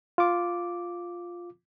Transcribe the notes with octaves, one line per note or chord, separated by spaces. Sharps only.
F4 D6